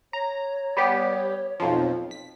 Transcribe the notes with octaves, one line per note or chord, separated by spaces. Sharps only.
C#5 A#5
G3 B3 G4
B1 F2 F3
B6